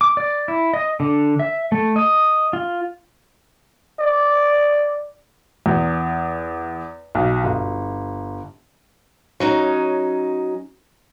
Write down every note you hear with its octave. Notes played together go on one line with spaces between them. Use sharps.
D6
D5
E4
D#5
D3
E5
A3
D#5
F4
D5
E2
B1
G1
F#3 C#4 D#4